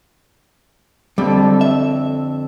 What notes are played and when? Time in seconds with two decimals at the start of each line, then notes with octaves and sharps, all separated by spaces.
1.18 F2 D3 G3
1.61 E5